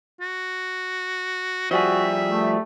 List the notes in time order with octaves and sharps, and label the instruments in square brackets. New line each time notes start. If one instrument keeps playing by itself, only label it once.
[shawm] F#4
[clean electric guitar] F3 G3 G#4 [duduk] F#4 [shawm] E5
[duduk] A3